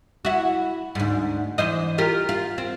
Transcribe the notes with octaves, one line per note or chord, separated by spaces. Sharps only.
E4 F#4
D2 G#2
E3 C5 D#5
F4 G4 A#4
F4
C4